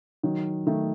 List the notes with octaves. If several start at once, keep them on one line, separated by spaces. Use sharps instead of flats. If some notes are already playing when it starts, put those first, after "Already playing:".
D#3 F#3
D#3 A3